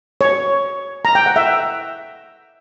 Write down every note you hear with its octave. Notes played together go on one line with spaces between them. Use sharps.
C#5
A#5
G5
F#5
E5